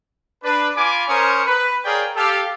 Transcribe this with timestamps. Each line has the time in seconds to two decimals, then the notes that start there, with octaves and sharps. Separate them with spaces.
0.43 D4 B4
0.76 F4 G#5 B5 D6
1.08 C#4 A#4 C5 C#5 C#6 D#6
1.45 B4
1.84 G#4 A#4 C#5 D5 F5 G5
2.16 G4 A4 F5